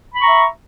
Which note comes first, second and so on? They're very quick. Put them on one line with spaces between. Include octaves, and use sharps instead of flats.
B5 C#6 A#5 E5